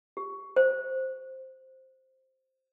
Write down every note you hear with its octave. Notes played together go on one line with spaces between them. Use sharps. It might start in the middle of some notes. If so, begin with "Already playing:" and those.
G4
C5